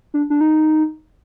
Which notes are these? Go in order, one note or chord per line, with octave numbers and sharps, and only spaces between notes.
D4
D4
D#4